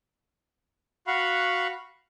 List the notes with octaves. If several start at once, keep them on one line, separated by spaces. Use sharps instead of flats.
F#4 F5 F#5 B5 C#6